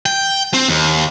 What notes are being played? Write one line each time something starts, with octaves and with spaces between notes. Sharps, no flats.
G5
C4
D#2